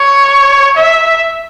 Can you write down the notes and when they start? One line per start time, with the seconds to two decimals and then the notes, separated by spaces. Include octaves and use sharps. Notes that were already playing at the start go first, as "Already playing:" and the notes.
Already playing: C#5
0.77 E5